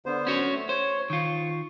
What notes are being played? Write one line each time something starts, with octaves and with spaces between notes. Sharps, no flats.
D3 B3 C5
C#4 F#4 C#5
A3
C5 C#5
D#3 F4 C#6